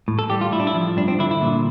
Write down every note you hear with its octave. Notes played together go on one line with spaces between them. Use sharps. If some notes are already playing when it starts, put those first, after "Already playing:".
A2
A4
G3 G4
F4
A2 E4
D4
E4
F3
G2 D4
C4
D3 E4
E4
A#2